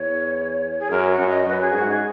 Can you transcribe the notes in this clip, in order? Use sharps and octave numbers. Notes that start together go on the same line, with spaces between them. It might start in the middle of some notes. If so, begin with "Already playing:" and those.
Already playing: E2 C#5
G#4
F#2 A#4
F#4
F#2
D#5
F#2 B4
G#4
G#2 F#4
G#4